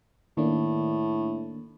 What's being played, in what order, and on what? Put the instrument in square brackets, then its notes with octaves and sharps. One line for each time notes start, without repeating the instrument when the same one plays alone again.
[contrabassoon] A2 [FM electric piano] D#3 A#3 D4